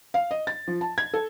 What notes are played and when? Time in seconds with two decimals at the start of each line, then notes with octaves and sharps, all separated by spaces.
0.14 F5
0.31 D#5
0.47 A6
0.68 F3
0.81 A5
0.98 G#6
1.14 A4